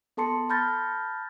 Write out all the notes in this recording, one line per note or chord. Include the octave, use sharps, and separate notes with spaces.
B3 A4 A5 C6 C#7
A5 B5 F6 G6 A6 A#6